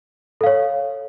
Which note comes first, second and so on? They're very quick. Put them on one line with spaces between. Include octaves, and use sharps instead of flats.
A4 F5 C#5